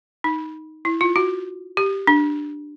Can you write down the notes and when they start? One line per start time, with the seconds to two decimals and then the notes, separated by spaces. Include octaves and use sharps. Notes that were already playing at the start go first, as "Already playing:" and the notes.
0.24 D#4
0.85 E4
1.01 F4
1.16 F#4
1.77 G4
2.07 D4